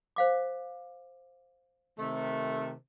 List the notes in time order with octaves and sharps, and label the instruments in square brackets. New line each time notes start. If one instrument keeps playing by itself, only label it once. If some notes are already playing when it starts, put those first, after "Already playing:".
[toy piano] C5 F5 D6
[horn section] C3 D#3 A3